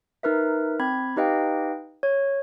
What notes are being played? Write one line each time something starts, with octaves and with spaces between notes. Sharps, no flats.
D#4 A#4 B4 E5
C4 B5 G#6
D#4 G4 B4 D#5 F5 G5
C#5